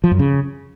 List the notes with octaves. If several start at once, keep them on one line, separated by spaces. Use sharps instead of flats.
F3
F#2
C#3